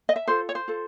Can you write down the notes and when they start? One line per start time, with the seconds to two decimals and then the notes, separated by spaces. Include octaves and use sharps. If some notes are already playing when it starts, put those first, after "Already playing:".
0.09 D#5
0.16 E5
0.28 F4 A4 C5
0.49 C#5
0.55 C5
0.68 F4 A4